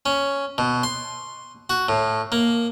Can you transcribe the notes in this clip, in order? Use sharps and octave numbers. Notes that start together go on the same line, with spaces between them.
C#4
B2
C6
F#4
A2
A#3